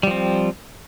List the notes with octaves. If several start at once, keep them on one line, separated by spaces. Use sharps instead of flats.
F3 G3 C4